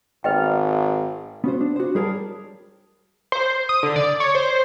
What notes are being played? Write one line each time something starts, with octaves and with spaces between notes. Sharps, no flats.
G#1 B4 D#5 G5
B3 C#4 F#4 C5
D4
F#4 C5
G3 G#4 A#4 C#5 A5
C5
D#6
D3
D5
C#5
C5